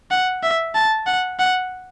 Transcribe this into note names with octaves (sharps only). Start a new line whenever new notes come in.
F#5
E5
A5
F#5
F#5